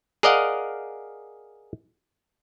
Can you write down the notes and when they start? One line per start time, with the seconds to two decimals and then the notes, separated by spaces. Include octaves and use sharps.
0.23 G#4 A#4 D5 D#5 F5 F#5